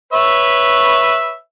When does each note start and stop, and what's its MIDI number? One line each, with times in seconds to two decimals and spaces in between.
0.13 1.36 71
0.13 1.36 73
0.13 1.36 76